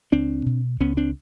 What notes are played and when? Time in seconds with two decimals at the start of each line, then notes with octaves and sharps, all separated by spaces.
0.12 C#2 C4 D4
0.46 B2
0.80 C#2 B3 C#4
0.97 C4 D4